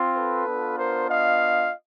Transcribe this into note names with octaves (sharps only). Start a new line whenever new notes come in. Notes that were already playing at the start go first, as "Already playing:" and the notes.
Already playing: C4 F4
A4 B4
B3 D4 F4
A#4 C5
D#5 F5